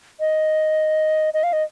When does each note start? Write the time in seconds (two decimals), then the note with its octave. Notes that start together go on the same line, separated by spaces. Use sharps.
0.20 D#5
1.34 D#5
1.43 F5
1.53 D#5